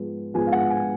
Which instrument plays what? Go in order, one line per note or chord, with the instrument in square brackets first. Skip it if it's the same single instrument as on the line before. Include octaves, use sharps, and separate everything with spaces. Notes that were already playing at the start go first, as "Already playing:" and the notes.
Already playing: [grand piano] G#2 F3 G#3 B3
G#2 F3 G#3 B3 G#5
F5
F#5
G#5